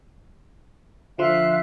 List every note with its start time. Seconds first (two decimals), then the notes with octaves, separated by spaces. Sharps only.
1.18 D3 F3 E5 F5 C6 F#6